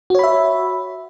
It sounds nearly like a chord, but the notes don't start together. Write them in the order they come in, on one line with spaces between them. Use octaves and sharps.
F#4 C#5 B5 E5